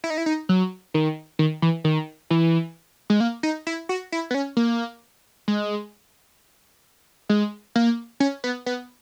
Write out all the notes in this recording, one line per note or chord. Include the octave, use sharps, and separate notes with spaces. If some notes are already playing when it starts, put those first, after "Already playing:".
E4
D#4
E4
D#4
F#3
D#3
D#3
E3
D#3
E3
G#3
A#3
D#4
E4
F#4
E4
B3
C#4
A#3
G#3
G#3
A#3
C#4
B3
B3